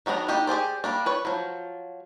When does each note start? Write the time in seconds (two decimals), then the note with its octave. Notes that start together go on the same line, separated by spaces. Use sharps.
0.06 D#3 F#3 B3 D4 A#5
0.28 A#3 D4 D#4 G4
0.47 G4 G#4 C5 D5
0.84 G3 A#3 D4
1.06 B4 C#5
1.25 F3 F#3